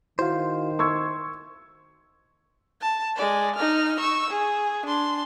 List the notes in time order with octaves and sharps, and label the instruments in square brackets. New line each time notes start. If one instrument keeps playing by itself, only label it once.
[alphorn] D#3 [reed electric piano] E4 F#4 F5 [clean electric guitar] C5
[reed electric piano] C6 [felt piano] C#6 E6 G#6
[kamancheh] A5
G#3 D5
D#4 F6
C#6 E6
G#4
D4 C6